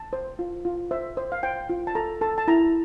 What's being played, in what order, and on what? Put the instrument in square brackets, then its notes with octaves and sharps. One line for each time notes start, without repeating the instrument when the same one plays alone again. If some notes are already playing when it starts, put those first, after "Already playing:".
Already playing: [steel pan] A5
C5
F4
F4
C5 E5
C5
F5
C5 G5
F4
A5
A4 A#5
A4 A5
A5
E4 A#5